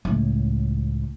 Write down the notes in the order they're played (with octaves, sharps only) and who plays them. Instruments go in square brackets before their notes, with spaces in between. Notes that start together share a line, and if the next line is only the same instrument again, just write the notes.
[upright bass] C#2 A2